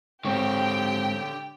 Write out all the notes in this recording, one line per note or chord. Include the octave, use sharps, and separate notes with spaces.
G#2 D3 C4 G4 C#5 G5